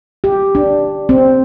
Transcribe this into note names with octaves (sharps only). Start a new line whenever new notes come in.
G4
D4
C4